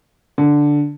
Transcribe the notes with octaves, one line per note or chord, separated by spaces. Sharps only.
D3